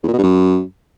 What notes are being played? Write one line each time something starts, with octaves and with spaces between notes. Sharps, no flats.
E2
A#2
B2
G2
F#2